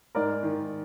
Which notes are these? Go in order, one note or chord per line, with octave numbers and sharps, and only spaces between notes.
G#2 A#4 D5
D#3